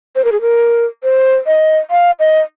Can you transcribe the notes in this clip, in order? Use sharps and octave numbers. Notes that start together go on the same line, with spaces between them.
C5
A#4
G#4
A#4
C5
D#5
F5
D#5